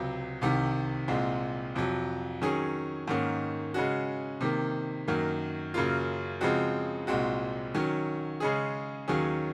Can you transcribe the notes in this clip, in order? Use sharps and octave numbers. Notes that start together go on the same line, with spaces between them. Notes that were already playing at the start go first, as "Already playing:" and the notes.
Already playing: C#2 C3 F#3
C2 C3 D#3
C2 A#2 G#3 C4
F2 C3 F#3
D#3 F#3 C#4 G#4
G#2 D#3 A#3 C#4
C#3 G#3 C#4 F#4
C3 D#3 A#3
F#2 D#3 F#3 A#3
F#2 C#3 F#3 A#3 F4
C#3 F3 G#3 C4 F#4
C2 A#2 G#3 C4 F#4
D#3 F#3 C#4
C#3 G#3 C#4 G#4
D#2 D#3 F#3 C#4 G#4